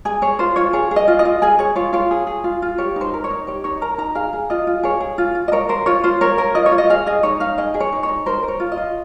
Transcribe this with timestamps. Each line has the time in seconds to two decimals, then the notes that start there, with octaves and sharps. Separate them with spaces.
0.05 G#4 G#5
0.22 G#4 C#5
0.39 F4 C5
0.56 F4 C#5
0.73 G#4 C#5
0.91 G#4
0.96 D#5
1.08 F4
1.19 D#5
1.25 F4
1.42 G#4 G#5
1.59 G#4 C#5
1.76 F4 C#5
1.93 F4 C#5
2.11 G#4
2.27 G#4
2.44 F4
2.62 F4
2.78 G4 C#5
2.96 D#4 C5
3.14 A#4
3.24 C#5
3.31 D#4
3.47 G4 C#5
3.64 D#4 C#5
3.81 A#4 A#5
3.98 D#4 A#5
4.15 G#4 F5
4.33 G#4
4.50 F4 D#5
4.67 F4
4.83 G#4 C#5
5.01 G#4
5.18 F4
5.35 F4
5.48 D#5
5.52 A#4 C#5
5.69 A#4 C5
5.86 F4 C#5
6.04 F4 C5
6.21 A#4 C#5
6.38 A#4
6.55 F4 D#5
6.66 C#5
6.72 F4
6.78 D#5
6.90 G#4 F5
7.06 G#4 D#5
7.23 D#4 C#5
7.40 D#4 F5
7.58 G#4 D#5
7.74 G#4
7.80 C#5
7.92 D#4
8.03 C#5
8.09 D#4
8.26 A#4 C5
8.43 A#4
8.48 C#5
8.60 F4
8.72 D#5
8.77 F4